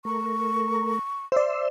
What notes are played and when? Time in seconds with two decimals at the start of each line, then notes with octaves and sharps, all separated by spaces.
0.05 A3 A#4 C#6
1.32 C5 D5 E5 C6 E6